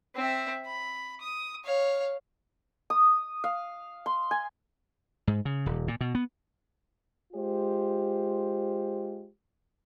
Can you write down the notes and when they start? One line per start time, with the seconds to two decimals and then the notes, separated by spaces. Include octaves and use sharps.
0.15 C4 E5
0.66 B5
1.21 D#6
1.64 C#5 F5
2.90 D#6
3.44 F5
4.06 C6
4.31 G#5
5.27 G#2
5.45 C#3
5.66 D#1
5.88 A#2
6.01 B2
6.15 B3
7.33 G#3 F4 G4 C5